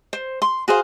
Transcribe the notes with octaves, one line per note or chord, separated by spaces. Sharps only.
C5
C6
F#4 G#4 C5 F5